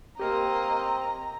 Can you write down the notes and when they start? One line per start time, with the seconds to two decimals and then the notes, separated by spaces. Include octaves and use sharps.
0.19 A#3 C4 G4 A#4 D#5 F5 A#5